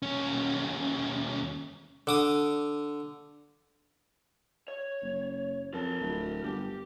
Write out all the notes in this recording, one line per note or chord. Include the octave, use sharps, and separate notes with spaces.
D#2 C#4
D3 D6 D#6
C#5
F#1
F2 A#4 A5
D1
G1 G4